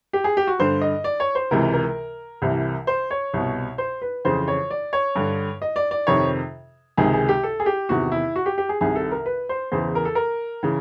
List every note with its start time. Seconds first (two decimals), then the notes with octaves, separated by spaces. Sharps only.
0.13 G4
0.24 G#4
0.37 G4
0.47 F#4
0.59 G2 D3 C5
0.81 D#5
1.04 D5
1.20 C#5
1.35 C5
1.51 C#2 C3 E3 A#4
1.74 A#4
2.42 C2 C3 E3
2.87 C5
3.11 C#5
3.34 C2 B2
3.78 C5
4.02 B4
4.24 F2 C#3 E3 C5
4.48 C#5
4.70 D5
4.93 C#5
5.16 G2 D3
5.62 D#5
5.76 D5
5.91 D5
6.07 F2 C3 D#3 C#5
6.97 C#2 C3 D#3 G#4
7.13 G#4
7.29 G4
7.43 A4
7.60 G#4
7.66 G4
7.89 E2 C3 D#3 F#4
8.12 E4
8.36 F#4
8.46 G4
8.58 G4
8.69 G#4
8.80 C2 C3 D#3 G#4
8.96 A4
9.11 A#4
9.26 B4
9.49 C5
9.72 E2 C#3 E3 C5
9.95 A#4
10.05 A4
10.15 A#4
10.63 C#3 E3